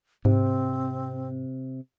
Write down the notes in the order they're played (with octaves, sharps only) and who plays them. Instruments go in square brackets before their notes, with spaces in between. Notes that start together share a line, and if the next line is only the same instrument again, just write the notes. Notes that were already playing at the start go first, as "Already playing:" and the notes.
[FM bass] G#2 [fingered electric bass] C3 [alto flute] C4